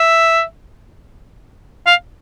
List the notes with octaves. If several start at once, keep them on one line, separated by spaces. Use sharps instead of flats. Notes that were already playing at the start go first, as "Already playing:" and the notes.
Already playing: E5
F5